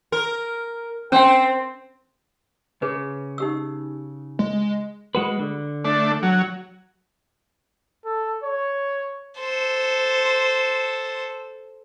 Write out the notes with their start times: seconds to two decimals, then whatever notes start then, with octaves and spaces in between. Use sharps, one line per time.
0.12 A#4
1.12 C4 C#4 G5
2.82 C#3 G#4 B4
3.38 D#4 G4 E6
4.39 G#3
5.15 G#3 F#4 B4
5.39 D3
5.84 A3 D4
6.23 F#3
8.05 A4
8.44 C#5
9.38 A4 C5